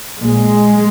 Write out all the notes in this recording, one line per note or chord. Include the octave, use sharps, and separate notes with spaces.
A#1 A#2 G#3